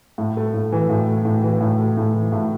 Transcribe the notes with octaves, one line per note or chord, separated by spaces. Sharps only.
A2
A3
A2
E3
A2
A3
A2
E3
A2
A3
A2
E3
A2